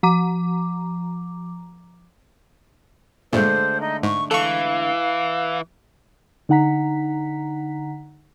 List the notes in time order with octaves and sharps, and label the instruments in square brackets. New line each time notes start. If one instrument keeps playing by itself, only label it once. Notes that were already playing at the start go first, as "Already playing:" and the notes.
[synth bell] F3 A#5 D6
[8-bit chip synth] G2 A#2 [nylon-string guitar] D3 G#3 A3 [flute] C5
[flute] D#4
[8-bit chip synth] G#2 [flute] C#6
[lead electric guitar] E3 [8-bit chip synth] A4 C#6 [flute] F5
[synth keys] D3 D#4 F#5 A#5 B6